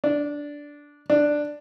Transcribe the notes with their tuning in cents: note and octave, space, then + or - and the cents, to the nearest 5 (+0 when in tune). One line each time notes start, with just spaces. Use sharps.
D4 -10
D4 +5